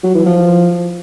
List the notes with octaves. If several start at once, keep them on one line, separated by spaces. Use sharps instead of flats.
F#3
E3
F3